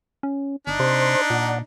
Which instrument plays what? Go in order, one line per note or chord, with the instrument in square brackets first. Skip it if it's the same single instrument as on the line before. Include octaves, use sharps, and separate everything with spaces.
[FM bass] C#4
[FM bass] G1 [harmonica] D4 D#4
[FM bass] C3 [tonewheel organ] C5 C6
[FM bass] A#2 [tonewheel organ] D5 F#5